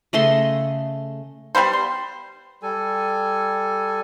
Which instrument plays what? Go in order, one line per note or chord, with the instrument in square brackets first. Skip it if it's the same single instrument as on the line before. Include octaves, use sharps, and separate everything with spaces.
[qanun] C#3 A3 D#5 C6
[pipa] G3 G#3 B3 C5
C6
[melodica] G3 A4 G#5